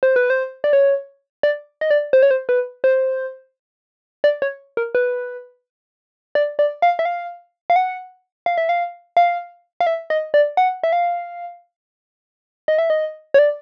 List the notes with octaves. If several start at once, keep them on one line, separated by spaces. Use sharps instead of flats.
C5
B4
C5
D5
C#5
D5
D#5
D5
C5
C#5
C5
B4
C5
D5
C#5
A#4
B4
D5
D5
F5
E5
F5
F5
F#5
F5
E5
F5
F5
F5
E5
D#5
D5
F#5
E5
F5
D#5
E5
D#5
C#5
D5